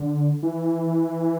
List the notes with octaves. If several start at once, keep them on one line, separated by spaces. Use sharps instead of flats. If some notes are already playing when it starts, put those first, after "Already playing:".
Already playing: D3
E3